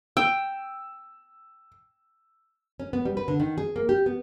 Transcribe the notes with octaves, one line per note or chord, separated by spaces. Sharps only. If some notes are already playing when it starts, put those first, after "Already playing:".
G5 E6
C#4
B3
G3
B4
D3
D#3
G#4
A#3
G4
B3